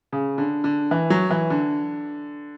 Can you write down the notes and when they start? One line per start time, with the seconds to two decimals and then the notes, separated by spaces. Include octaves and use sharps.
0.12 C#3
0.38 D3
0.64 D3
0.91 E3
1.10 F#3
1.30 E3
1.50 D3